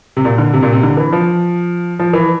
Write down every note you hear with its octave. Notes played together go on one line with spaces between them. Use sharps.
C3
A#2
D3
C3
A#2
C3
D3
E3
F3
F3
E3